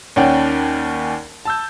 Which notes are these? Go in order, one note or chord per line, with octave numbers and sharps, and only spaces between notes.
D#2 C#4 D5 F#5 G5
A5 E6 G6